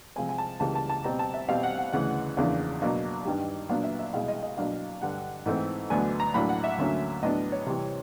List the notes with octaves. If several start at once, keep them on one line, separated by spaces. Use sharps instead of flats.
C3 F3 G#3 C4 G#5
G#5
A5
C#2 C#3 E3 G3 A#3 A5
A5
A5
B2 G3 C4 A#5
A5
E5
B2 G3 C4 F5
F#5
F#5
D2 C#3 E3 F#5
E2 C#3 F3 A#3 D4
B2 F#3 A#3 D4
G2 D#3 G3
A#2 F#3 B3 D4 F5
E5
E5
C2 B2 G#3 F5
D#5
D#5
B2 F#3 A#3 D4 F5
G2 D3 G3 F#5
G#2 E3 A3 C4
D2 D3 F#3 B3 D4 G#5
A#5
A2 F#3 A#3 D4 B5
F#5
E5
D2 D3 F#3 A#3 C#4
A2 F#3 B3 D4 D#5
C#5
C3 E3 G3 C4